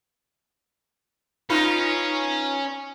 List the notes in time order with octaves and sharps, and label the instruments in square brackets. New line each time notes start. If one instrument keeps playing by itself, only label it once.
[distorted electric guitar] C#4 [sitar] D#4 F4 B4